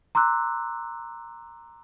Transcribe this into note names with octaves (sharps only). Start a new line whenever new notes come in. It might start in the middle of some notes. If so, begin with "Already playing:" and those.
A#5 C6 D6 E6 F#6